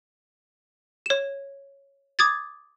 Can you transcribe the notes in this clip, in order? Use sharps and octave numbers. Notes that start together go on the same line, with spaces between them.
C#5 E7
D6 D#6 G#6 A6